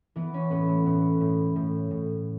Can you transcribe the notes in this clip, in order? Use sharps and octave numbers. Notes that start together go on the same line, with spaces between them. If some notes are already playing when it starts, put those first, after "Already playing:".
E3 B3
C#4
A2 B3
A3
A2 B3
A2
A2
A2